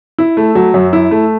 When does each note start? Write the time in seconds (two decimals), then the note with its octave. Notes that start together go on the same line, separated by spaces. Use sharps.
0.18 E4
0.37 A3
0.55 F#3
0.74 F#2
0.93 E4
1.11 A3